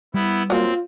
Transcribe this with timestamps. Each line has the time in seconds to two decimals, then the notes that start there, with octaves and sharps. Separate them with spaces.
0.14 G3 B3 E4
0.50 F#3 A#3 C4 F4